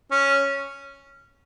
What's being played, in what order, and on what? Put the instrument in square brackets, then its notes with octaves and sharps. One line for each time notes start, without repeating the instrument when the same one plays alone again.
[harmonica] C#4